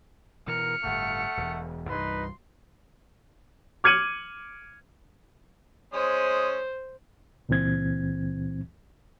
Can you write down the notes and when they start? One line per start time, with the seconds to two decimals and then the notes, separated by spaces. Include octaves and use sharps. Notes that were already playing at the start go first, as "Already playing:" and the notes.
0.47 B2 E3 A#4 F6 C#7
0.84 G1 A2 A3 F#5
1.37 E1 E2
1.90 C2 G2 E3 D#4 B4 C6
3.84 D6 F6 G#6 C#7 D#7 F#7
5.93 G#3 C#4 C5 D#6
7.49 C#2 A#2 E3 C4 G#6